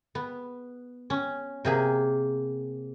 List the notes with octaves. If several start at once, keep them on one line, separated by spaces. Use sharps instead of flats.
B3
C#4
C3 A#3 G#4